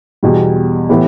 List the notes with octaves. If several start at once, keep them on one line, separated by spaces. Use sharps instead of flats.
E2 B2 G3
A2 E3 B3 E4 G4